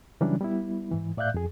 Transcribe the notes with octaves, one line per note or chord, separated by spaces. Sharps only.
C#3 E3 F#3 G3 C#4 D4
G3 B3 E4
G#2 E3
A2 D5 E5 F5 F#6 G6
F2 G#4